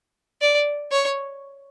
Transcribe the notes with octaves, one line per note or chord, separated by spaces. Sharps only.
D5
C#5